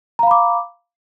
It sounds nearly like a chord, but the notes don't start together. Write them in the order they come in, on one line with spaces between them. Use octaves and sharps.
A#5 F5 B5 D6